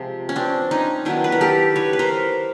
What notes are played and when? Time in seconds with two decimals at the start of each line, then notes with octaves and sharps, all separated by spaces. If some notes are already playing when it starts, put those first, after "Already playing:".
Already playing: C3 F3 G#3
0.29 C#4
0.36 C4 D4
0.71 C#4 D#4
1.05 D#3 F#3 B3 D4 E4
1.24 B4
1.32 A#4
1.41 G4 A4
1.76 B4 C#5
1.93 B4
1.99 A#4 C5